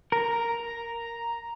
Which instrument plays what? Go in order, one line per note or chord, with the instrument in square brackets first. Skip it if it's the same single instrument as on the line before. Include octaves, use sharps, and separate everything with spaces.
[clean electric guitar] A#4 [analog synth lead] A#5